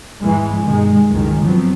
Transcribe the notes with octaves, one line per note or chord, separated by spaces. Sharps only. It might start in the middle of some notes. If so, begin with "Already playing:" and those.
E2 G#2 E3 G#3
G2 B2 D#3 G#3
G1 C#2 F#2 D#3 G#3
F3 F#3 B3 C4